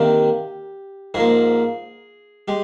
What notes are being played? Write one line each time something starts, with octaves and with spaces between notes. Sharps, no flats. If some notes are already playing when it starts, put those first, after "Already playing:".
Already playing: C3 D#3 A#3 D4 G4
G#2 F3 A#3 G#4
G#3 G4